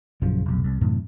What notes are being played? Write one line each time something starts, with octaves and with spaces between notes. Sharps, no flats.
A#1 F#2 C#3 F3
F1 B1
C2
F#2 A2 C3 E3